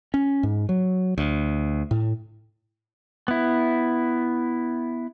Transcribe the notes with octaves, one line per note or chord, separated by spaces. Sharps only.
C#4
G#2
F#3
D2
A2
B3 E4